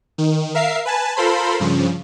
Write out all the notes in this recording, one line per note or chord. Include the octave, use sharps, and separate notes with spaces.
D#3
A#4 E5 F5 C7
B4 G#5 A5
F4 A4 A#4 C5 B5 C6
G2 C#3 F3